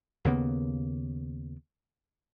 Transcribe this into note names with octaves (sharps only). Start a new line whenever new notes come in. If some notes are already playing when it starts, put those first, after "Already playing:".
D#2 C#3 A#3 B3